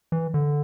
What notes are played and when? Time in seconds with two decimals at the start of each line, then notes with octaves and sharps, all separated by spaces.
0.12 E3
0.34 D3